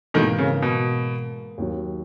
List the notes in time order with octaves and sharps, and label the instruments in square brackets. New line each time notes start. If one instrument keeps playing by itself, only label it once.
[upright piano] G#2 E3 A#3 [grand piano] B2 D#3
[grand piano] C#3
B2
[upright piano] D#2 D#3 F#3